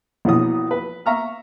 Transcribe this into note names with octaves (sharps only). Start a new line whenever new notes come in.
A#1 B2 E3 C#5 D#6
B4
E5 F5 A#5 C#6 F6